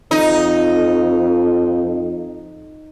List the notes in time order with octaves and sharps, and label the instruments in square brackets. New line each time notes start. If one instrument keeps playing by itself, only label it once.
[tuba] F2 [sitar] D#4